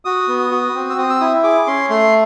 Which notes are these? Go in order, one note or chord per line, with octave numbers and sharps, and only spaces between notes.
F#4 D#6
B3
F#4
C4
E6
C4 D#6
E6
E4 D#6
G#4 D6
C#4 C6
A3 C6